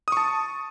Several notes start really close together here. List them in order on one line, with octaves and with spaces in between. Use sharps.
D#6 C#6 A5